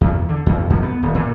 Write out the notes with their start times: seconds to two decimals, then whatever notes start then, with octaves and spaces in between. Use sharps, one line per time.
0.01 E2
0.29 D3
0.46 E2
0.70 F2
0.83 B3
1.03 D#1
1.15 A#2